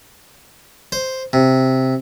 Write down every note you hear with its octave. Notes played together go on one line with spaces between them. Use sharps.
C5
C3